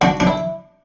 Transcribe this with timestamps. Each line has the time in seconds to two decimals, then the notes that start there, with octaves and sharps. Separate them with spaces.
0.01 D4 F#4
0.20 D4
0.27 E4